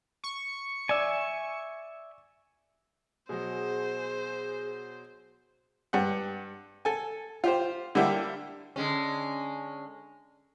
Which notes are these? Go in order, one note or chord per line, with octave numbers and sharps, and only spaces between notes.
C#6
D5 E5 G#5
B2 F#3 G#4 C5
G2 F#5
A4 G#5
F4 G4 C5
D3 G3 A#3 E4 G4
D3 G#3 C#4